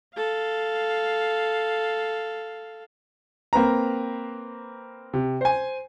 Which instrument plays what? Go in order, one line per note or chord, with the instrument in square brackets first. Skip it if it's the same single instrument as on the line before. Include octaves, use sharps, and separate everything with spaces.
[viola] A4 F5
[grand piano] A#3 C4 B4 A#5
C3
C5 G#5